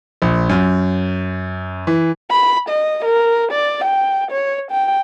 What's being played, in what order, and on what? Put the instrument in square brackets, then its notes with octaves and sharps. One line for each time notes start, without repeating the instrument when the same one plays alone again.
[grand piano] A#1
F#2
E3
[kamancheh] B5
D#5
A#4
D5
G5
C#5
G5